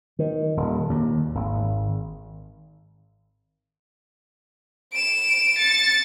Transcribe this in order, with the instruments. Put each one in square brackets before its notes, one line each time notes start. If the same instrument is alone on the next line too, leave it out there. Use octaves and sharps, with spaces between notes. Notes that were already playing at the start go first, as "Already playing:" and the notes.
[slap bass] D#3
D#1
D#2
G#1
[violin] D7 E7
A6 C#7